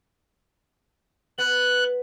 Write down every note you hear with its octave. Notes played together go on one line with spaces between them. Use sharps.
B3 F#6